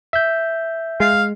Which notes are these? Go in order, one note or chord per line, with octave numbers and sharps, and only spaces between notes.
E5 G6
G#3 F5